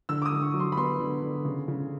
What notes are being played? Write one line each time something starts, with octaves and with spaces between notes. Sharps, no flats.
D3 E6
D6
D#6
D3
C#6
F#3
C6
B5
B3 C6
D3
D3
C#3
C#3